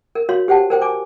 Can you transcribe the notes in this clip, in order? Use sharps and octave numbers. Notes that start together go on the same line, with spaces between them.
A#4
F#4 C#5 F5 C6
G4 C5 F#5 G5 A5
A#4 C5 G5
G#5 D6